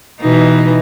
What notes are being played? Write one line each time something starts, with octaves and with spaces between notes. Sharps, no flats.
B2 E3 D#4